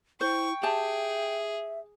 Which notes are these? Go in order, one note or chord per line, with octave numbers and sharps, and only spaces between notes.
E4 C5 G5 C#6
G4 G#4 E5 A5